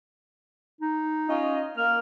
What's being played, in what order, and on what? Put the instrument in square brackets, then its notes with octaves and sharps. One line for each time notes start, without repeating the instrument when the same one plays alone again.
[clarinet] D#4
[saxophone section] C#4 F4 D#5
[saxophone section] A#3 [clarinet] F6